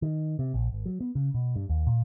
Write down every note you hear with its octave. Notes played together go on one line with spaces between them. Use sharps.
D#3
C3
A#1
G#1
F#3
B3
C#3
B2
G2
D#2
A#2